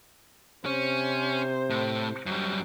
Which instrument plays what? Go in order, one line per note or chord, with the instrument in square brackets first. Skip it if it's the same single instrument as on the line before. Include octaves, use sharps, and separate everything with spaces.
[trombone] C3 [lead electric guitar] C#4 [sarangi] C5
[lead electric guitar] A2
F#2 G3